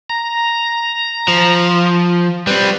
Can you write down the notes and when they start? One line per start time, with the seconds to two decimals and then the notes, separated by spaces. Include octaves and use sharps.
0.10 A#5
1.28 F3
2.47 G3 C4 B4